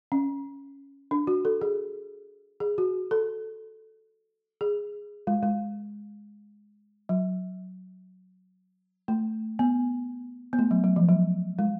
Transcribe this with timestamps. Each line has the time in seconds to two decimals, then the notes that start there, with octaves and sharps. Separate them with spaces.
0.12 C#4
1.11 D4
1.27 F#4
1.45 A4
1.61 G#4
2.60 G#4
2.78 F#4
3.11 A4
4.61 G#4
5.27 G#3
5.43 G#3
7.09 F#3
9.08 A3
9.59 B3
10.53 B3
10.59 A3
10.71 F#3
10.84 F#3
10.96 F3
11.09 F#3
11.59 G#3